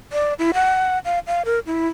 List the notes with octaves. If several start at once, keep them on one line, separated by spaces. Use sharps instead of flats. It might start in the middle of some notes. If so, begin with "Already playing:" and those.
D5
E4
F#5
F5
F5
A#4
E4